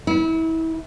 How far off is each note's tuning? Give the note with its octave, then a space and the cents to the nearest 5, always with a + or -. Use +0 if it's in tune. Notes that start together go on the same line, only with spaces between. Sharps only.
E4 -30